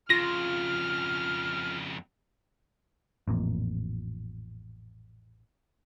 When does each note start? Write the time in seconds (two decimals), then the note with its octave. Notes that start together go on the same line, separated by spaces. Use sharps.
0.10 F2 C#3 F4 F6 A#6
3.28 A1 F2 A#2